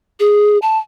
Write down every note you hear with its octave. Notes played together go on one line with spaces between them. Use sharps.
G#4
A5